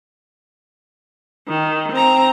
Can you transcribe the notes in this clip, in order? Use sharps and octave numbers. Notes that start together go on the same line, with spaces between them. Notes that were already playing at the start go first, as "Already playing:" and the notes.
D#3
C4 A#5